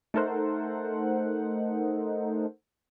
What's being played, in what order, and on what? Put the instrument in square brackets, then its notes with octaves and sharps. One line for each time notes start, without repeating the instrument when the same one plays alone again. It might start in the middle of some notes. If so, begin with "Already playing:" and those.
[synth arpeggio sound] A3 D#4 A4 A#4 C5 F#5